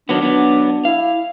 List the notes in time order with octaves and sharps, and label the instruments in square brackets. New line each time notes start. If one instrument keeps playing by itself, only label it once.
[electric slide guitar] D#3 F#3 B3 [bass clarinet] D4
[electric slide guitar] F#3 B3
[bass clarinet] E4 [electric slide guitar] F5